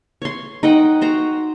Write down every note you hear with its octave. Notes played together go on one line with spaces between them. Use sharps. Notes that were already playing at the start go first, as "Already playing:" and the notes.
C#5 C6
D#4 D#5 F#5 G5
F#4 C5 A#5